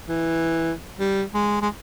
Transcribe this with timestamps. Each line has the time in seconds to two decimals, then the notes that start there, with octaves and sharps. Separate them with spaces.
0.08 E3
0.99 G3
1.34 G#3
1.62 G#3